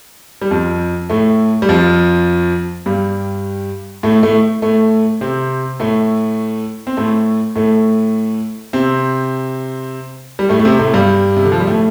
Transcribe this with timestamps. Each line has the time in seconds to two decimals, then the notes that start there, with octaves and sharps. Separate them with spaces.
0.42 G3
0.51 F2 F3
1.10 A2 A3
1.62 G3
1.69 F2 F3
2.86 G2 G3
4.03 A2 A3
4.23 A2 A3
4.62 A2 A3
5.21 C3 C4
5.80 A2 A3
6.87 C4
6.97 A2 A3
7.56 A2 A3
8.73 C3 C4
10.39 G3
10.49 A2 A3
10.59 A3
10.65 C3 C4
10.79 A2 A3
10.94 G2 G3
11.37 C3
11.45 D3
11.52 F3
11.60 G3
11.67 A2 A3